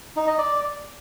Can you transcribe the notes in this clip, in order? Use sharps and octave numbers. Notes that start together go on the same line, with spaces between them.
D#4
D#5
D5